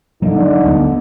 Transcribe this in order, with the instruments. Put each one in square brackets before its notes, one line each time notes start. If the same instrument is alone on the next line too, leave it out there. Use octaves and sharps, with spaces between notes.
[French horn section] D3 D#4 [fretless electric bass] F#3 G3 A#3
[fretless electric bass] D2 B3